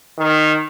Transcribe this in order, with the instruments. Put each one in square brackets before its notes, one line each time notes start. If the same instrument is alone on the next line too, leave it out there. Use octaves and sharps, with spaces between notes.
[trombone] D#3